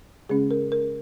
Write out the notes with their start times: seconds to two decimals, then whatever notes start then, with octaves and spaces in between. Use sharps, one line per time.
0.29 C#3 G#3 C#4 G#4
0.51 A#4
0.72 A#4